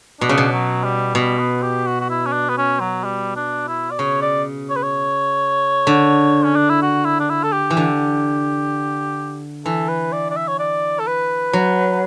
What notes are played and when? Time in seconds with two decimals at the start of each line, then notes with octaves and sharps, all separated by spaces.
0.21 B2 D4
0.29 C#3
0.38 B2
0.52 F#3
0.84 G3
1.15 B2 G3
1.39 B3
1.62 G4
1.86 F#4
2.00 F#4
2.10 E4
2.26 C#4
2.33 D4
2.49 B3
2.57 C#4
2.80 F#3
3.04 G3
3.36 D4
3.68 E4
3.91 D5
3.98 C#3 C#5
4.22 D5
4.70 C#5
4.76 B4
4.83 C#5
5.87 D3
6.44 C#4
6.56 D4
6.69 E4
6.82 F#4
7.05 E4
7.20 D4
7.29 E4
7.43 A4
7.52 G4
7.70 E3
7.77 D3
9.66 E3 A4
9.89 B4
10.12 D5
10.30 D5
10.36 E5
10.48 C#5
10.59 D5
10.99 A4
11.07 B4
11.53 F#3